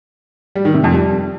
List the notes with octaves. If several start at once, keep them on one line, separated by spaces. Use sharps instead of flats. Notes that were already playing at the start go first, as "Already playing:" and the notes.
G3
D#3
C3
F2
G3